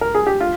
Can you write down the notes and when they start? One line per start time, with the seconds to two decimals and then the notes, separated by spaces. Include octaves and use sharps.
0.01 A#4
0.15 G#4
0.27 G4
0.40 F4